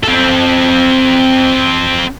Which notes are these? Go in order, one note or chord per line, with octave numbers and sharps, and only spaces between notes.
C4 A4